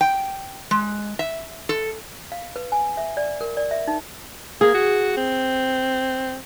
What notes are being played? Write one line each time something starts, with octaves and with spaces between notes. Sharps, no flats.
G5
G#3
E5
A4
F5
B4
G#5
E5
D5
A#4
D5
E5
D#4
A#3 G#4
F#4
C4